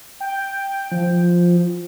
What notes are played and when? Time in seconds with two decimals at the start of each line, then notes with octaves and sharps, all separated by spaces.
0.20 G5
0.92 F3